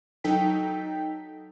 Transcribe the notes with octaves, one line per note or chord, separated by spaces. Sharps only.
F#3 D#4 A4 G5 B6